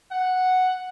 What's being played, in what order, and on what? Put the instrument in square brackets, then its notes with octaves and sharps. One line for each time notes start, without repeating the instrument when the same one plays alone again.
[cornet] F#5